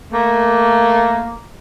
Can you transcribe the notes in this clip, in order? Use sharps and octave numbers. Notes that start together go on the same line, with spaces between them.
A3 A#3